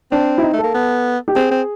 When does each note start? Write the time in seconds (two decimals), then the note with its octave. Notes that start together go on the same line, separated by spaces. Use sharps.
0.12 C4 D4
0.38 E4
0.42 D#4
0.53 A3
0.58 A#3 A4
0.74 B3
1.28 G4
1.35 C4 G#4
1.51 C4